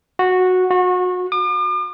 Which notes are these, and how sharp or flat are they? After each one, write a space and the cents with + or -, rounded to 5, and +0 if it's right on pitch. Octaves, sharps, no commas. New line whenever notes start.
F#4 -10
F#4 -30
D6 +45